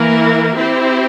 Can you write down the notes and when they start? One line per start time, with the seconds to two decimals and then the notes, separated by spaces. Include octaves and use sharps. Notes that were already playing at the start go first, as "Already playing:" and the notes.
Already playing: E3 A#3 E4 A#4
0.56 C4 E4 G4 C5